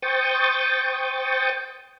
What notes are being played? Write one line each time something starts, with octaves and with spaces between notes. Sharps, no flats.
C5 G5 C#6 D#6 G6 A6